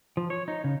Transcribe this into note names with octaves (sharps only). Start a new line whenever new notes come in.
F3
C#5
D#4
C#3